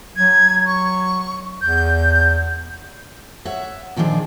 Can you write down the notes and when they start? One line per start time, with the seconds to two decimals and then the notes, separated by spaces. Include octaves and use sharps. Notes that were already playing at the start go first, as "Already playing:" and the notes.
0.16 F#3 G#6
0.66 C#6
1.61 E2 G6
3.45 C#5 E5 F#5
3.96 A#2 D#3 F3 D4 G#4